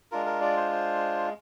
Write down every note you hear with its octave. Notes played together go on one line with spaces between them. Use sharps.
G#3 D4 F4 A#4
A#4
D5
C5
C5